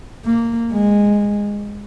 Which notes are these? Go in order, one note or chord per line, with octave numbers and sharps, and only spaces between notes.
A#3
G#3